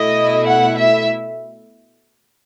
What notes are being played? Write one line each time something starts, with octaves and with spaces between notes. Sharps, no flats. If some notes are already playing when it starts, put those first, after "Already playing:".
Already playing: B2 A3 E4 D#5
F#5
E5